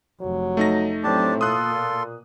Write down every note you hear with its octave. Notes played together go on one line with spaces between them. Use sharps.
F1 F#3
A3 D#4 A#6
A2 F#3 C4 D4 G4 A5
B2 A#3 F4 A4 C6 D#6 F#6
A#2